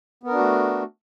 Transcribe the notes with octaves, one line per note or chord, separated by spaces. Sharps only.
A3 B3 D4 F#4 A#4